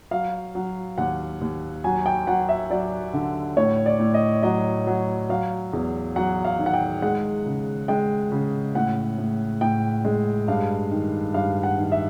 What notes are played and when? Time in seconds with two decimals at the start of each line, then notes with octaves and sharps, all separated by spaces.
0.11 F#3 F5
0.55 F#3
0.98 D#2 F#5
1.41 D#2
1.84 F#3 G#5
2.06 G5
2.27 F#3 F#5
2.49 E5
2.70 F#3 D5
3.14 D3
3.57 A2 C#5
3.86 D5
4.00 A2
4.14 D#5
4.43 F#3 D#5
4.87 F#3
5.29 F#3 F5
5.73 E2
6.16 F#3 F#5
6.45 F5
6.59 D#3
6.66 F#5
6.73 G5
7.02 G#3 F#5
7.46 C#3
7.88 G#3 G5
8.32 C#3
8.75 A2 F#5
9.18 A2
9.61 A2 G5
10.05 G#3
10.48 G2 F5
10.91 D#3
11.34 G2 F5
11.63 F#5
11.78 D#3
11.92 E5